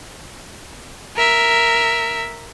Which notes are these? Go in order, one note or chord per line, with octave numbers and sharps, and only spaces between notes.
A#4 E5